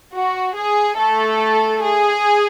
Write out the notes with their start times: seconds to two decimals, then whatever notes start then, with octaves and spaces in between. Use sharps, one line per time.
0.13 F#4
0.56 G#4
0.98 A3 A4
1.82 G#4